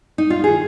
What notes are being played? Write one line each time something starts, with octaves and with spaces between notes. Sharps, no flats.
D#4
F4
D#3 G#4